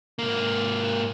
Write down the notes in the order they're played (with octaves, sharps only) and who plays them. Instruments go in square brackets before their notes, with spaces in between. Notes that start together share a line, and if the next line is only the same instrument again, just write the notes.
[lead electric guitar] G#2 A#3